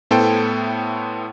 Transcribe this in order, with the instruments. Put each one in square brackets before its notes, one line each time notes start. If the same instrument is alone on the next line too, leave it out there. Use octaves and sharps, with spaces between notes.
[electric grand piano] A2 B3 E4 A4 C5 G5